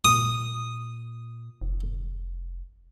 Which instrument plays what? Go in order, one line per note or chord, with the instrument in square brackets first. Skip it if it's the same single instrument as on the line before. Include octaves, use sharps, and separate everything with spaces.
[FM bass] A#2 [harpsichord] D#6
[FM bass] F1